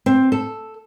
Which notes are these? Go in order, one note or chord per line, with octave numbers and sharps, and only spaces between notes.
C4
A4